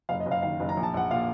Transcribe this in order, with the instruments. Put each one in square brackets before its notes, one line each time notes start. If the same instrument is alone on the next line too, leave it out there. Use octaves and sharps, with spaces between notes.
[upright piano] F#1 F5
D#5
F#1
F5
D#3 F5
F#1
A#5
A#1
A5
A#1 F#5
A#2 F5